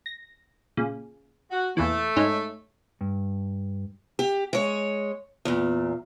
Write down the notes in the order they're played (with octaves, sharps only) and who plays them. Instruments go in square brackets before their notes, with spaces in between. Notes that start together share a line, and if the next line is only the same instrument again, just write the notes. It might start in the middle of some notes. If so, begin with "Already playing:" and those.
[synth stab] A#6
A#2 C#3
[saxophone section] F#4
[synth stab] E2 A#2 E3 [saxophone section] A3
[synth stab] G#2 C#4 D#4
[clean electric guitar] G2
[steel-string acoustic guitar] G4
G#3 C#5
E2 A#2